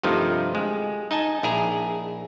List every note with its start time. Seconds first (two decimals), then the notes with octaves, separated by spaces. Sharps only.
0.03 G2 C3 D#3 F3 A3 D#4
0.55 G#3
1.11 D#4 D#5 G#5 A5
1.43 A#1 E4 G#4 A#5